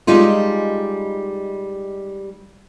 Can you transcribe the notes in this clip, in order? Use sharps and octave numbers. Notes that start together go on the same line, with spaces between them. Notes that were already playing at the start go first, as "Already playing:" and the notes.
G3 G#3 D#4 F4